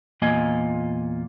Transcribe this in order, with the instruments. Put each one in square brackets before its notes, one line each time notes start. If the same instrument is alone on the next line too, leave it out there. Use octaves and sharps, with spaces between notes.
[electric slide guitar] E2 A#2 A#3 F4 D#5 G#5